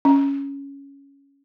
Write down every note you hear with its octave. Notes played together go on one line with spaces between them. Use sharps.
C#4